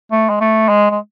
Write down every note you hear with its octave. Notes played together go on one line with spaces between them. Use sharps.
A3
G#3
A3
G#3
G#3